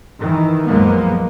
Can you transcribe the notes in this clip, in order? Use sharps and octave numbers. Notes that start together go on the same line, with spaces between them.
D#3 E3
A#1 F#2 F3 G#3 A#3 B3